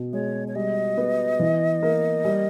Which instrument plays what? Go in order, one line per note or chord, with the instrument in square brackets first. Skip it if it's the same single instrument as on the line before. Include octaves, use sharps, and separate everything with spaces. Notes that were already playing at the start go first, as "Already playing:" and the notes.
Already playing: [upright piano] B2
[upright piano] G#3 [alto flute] C#5
[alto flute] C#5
[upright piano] G3 [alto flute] D#5
[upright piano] B3
E3
A#3
G3